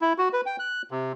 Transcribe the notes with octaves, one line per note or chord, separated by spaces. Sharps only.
E4
F#4
B4
G5
F#6
C3